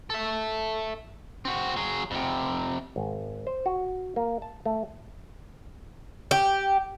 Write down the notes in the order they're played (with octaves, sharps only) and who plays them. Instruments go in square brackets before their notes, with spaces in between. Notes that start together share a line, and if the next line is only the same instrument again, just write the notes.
[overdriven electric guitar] A4 E5
C4 F#4
F#3 G#4
F2 C3
[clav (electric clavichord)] G#1
C5
F#4
A#3
A5
A3
[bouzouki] G4